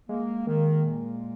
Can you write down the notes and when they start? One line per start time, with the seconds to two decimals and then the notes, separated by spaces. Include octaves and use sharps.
0.09 G#3 A#3
0.47 D#3 A#3
0.84 A#2